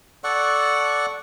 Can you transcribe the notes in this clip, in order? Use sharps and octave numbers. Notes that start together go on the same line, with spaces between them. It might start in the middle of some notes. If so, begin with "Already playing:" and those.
A4 D5 F#5 C#6